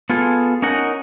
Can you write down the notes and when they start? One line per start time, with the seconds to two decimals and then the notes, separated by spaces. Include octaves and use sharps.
0.10 B3 F4 G#4 A4
0.62 C#4 D#4 A#4 F#5